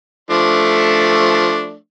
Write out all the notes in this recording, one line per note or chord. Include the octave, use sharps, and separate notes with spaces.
F3 A3 D4